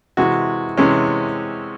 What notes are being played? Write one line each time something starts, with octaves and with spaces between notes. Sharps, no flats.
C3 E3 G#3 F#4
C3 E3 G#3 C#4